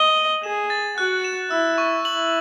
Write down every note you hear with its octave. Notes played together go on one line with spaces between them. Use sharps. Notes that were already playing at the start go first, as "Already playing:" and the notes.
Already playing: D#5
F#7
G#4 E7
A6
F#4 F#6
E7
E4 E6
C#6
E4 F#7